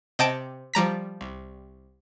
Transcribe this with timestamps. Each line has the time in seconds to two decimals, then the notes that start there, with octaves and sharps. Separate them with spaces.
0.19 C3 D#5 G5 A5 D7
0.74 F3 G3 A#5 B6
1.21 C2